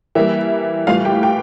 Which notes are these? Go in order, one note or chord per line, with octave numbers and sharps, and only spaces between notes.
E3 G3 A#3 E4 E5
A2 E3 G3 F4 F5
G4 G5
G4 G5